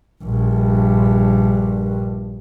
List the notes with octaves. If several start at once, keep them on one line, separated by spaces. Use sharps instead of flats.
A#1 G2